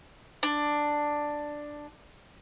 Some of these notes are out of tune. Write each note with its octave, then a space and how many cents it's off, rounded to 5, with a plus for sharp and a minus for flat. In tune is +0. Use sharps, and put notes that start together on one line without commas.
D4 +5